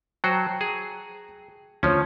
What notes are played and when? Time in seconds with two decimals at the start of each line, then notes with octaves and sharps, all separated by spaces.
0.24 F#3 F#4 C5 G5 A5 A#5
0.61 G#4
1.83 D2 F3 C#4 C#5